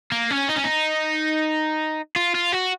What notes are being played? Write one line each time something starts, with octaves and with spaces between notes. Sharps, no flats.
A#3
C#4
D#4
C#4
D#4
F4
F4
F#4